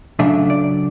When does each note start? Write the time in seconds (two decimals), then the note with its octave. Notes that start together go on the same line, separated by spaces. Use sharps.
0.19 C#3 F#3 A3 D4 E5
0.50 D5